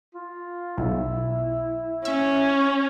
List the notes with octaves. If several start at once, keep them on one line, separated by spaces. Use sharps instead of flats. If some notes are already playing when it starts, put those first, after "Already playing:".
F4
B1 E4
C#4 E5